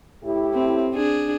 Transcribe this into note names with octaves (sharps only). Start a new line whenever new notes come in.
A2 E4 G4
C4
D4 G#4